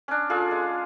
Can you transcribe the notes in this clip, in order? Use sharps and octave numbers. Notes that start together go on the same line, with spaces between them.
C#4 D4
F4 G#4 A4
G#3